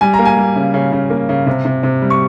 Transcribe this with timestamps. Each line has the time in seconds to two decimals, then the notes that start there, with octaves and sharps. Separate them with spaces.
0.01 G3 G#5
0.14 A#5
0.19 A#3
0.26 G#5
0.37 G3
0.56 C#3
0.74 C#3
0.92 C#3
1.10 A#3
1.29 C#3
1.46 C3
1.65 C3
1.83 C3
2.02 G3
2.10 C#6